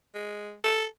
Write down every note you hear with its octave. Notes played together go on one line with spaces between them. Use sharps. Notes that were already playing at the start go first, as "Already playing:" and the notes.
G#3
A4